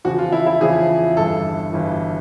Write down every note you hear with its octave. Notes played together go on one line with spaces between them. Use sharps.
E2 C#3 F3 F#4
F4
E4
E4
E2 C#3 F3 G#4
G1 G2 E3 A4
G1 G2 E3